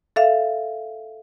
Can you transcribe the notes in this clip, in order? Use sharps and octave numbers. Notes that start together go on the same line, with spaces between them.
A4 E5 F5